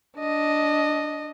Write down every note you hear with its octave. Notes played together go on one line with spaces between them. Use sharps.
D4 D#5